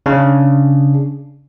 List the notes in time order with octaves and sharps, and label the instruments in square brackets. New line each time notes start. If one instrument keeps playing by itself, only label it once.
[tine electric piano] C#3 D4